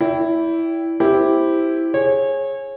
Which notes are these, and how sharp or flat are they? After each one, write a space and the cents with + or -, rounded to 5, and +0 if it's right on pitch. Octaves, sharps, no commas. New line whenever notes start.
E4 +0 D5 -45 G5 +0
C4 +0 E4 +0 G4 +0
G#4 +0 C#5 -30